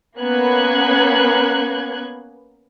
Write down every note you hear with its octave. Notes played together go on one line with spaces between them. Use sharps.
A#3 B3 C#4 F#6 G#6